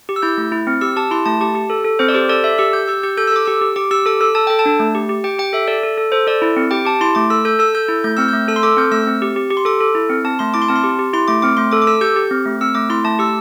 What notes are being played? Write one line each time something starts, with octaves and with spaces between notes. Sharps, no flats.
G4
E6
E4 G6
A3
E4
C4
G4 E6
G4 A5
E4 C6
A3 A5
G4 A5
G4
A4
A4
C4 C5
D5
G4 C5
A4 D5
A4 E5
G4 E6
G4 G6
G4 E6
G4 G6
A4 G6
E6
A4 D6
G4 E6
G4
G4 D6
G4 E6
A4 D6
A4 E6
A4 A5
A4 G5
A5
D4
A3
G4
G4
G4 G5
G4 G5
A4 E5
A4 D5
A4
A4
A4 C5
A4 D5
E4
C4
G4 G5
G4 A5
E4 C6
A3 D6
A4 E6
A4 G6
A4 E6
A4 G6
E4
A3 G6
C4 E6
G6
A3
A4 E6
C6
A4 D6
C4 G6
A3 E6
C4
G4
G4
G4
C6
A4 D6
A4
E4
C4
C4 A5
A3 C6
E4 D6
C6
C4 A5
C6
G4
G4
E4 C6
A3 D6
C4 D6
A3 C6
A4 D6
D6
A4 E6
G4 G6
G4
C4
A3
C4 E6
A3 D6
E4 C6
A3 A5
G4 E6